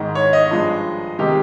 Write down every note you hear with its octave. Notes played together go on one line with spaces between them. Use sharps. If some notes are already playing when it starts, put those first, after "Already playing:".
Already playing: G#2 D#3 G#3 D#5
C#5
D#5
G2 F3 G#3
C3 D#3 G#3 G4